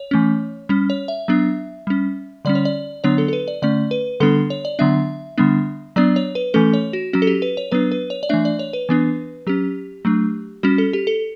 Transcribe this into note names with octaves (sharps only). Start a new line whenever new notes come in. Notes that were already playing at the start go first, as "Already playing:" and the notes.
Already playing: C#5
E3 A3 C#4
G3 C#4
C#5
E5
F#3 B3 D4
G3 C#4
D3 G3 C#4 D5
C#5
D5
D3 F#3 B3 D4 C#5
A4
A4
B4
D5
D3 A3 C#4 D5
B4
D3 G3 B3 D4 A4
C#5
D5
D3 F#3 B3 D4 E5
D3 G3 B3 D4
F#3 B3 D4 D5
C#5
B4
E3 A3 C#4 A4
C#5
F#4
F#3 C#4 F#4
A4
G4
B4
C#5
F#3 B3 D4 B4
B4
C#5
D5
E3 A3 D4 E5
D5
C#5
B4
E3 B3 D4
F#3 C#4 G4
F#3 A3 D4
G3 C#4 F#4
A4
G4
A4